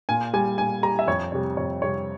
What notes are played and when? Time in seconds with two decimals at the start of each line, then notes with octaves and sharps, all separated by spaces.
0.09 A#2 G#5
0.33 G3 G#5
0.58 A#2 G#5
0.83 G3 A#5
0.99 E5
1.07 F2 C#5
1.32 C3 G3 C#5
1.57 F2 C#5
1.82 C3 G3 C#5